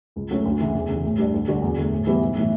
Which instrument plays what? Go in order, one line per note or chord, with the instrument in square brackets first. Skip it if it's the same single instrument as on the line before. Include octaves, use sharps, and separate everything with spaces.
[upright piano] C#2
C#3 F#3 A3 C#4
D2
C#3 E3
E2
C#3
E3
A2
G3 D4
D2
D3 G3 D4 F#4
E2
D3 A3
A2
E3 G3 B3
B1
A2 E3